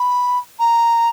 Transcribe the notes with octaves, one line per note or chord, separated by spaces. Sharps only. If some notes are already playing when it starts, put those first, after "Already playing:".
Already playing: B5
A#5